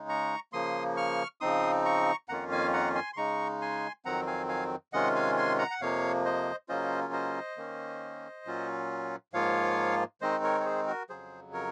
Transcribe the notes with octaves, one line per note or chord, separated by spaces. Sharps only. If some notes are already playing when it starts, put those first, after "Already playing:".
Already playing: C#3 G#3 D#4
A#5 C#6
C#3 F3 A#3 C6 D#6
C#6 F6
C#3 F3 C4 D#4 C6 D#6
A#5 C#6
F2 D#3 A#3 C#4 F4 F#5 A#5
F5 G#5
F#5 A#5
G#5 C6
C6
C#3 G#3 D#4 A#5 C#6
G#5 C6
F2 D#3 F#3 C4 F#5 A#5
F5 G#5
F5 G#5
C3 D#3 G#3 C#4 F4 D#5 F#5
F5 G#5
G#5 C6
F#5 A#5
F#5
F2 C3 F3 A#3 C#5 F5
C5 D#5
C#3 F#3 A#3 C#4 F4 C5 D#5
C5 D#5
D#3 A#3 C#4
A#2 F#3 C#4 F4
G#2 F3 A#3 F4 C#5 F5
D#3 G#3 C4 D#4 C5 D#5
A#4 C#5
C#5
G#4 C5
F#4 A#4
F2 C#3 F#3 G#4 C5
A#4 C#5